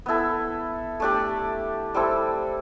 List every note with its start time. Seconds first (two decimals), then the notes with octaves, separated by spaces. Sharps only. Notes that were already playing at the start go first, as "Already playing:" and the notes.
0.06 B3 E4 A4
1.00 A3 D4 G4 D5
1.94 G3 C4 E4 A4